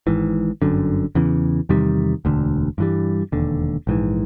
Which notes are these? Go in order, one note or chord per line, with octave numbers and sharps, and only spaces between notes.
G#1 G#2 E3
G1 F#2 D3
E2 C#3 E3
E2 C3 D#3 G3
E1 D2 D3
G2 E3 G3
E1 D#2 D3
A#1 G#2 E3